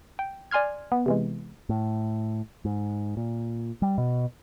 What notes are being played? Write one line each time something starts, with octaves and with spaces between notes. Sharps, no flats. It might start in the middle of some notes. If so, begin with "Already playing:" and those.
G5
D5 G#5 C6 F6 G#6
B3
C3 E3 G#3
A2
G#2
A#2
G3
B2